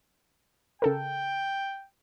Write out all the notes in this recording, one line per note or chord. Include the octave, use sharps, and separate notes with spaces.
C#3 A4 A#4 G5